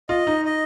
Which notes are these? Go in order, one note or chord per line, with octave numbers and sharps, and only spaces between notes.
F4 D#5
D#4
D#5